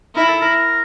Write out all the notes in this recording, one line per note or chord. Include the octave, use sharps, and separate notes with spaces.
E4 A#4
A4
A#4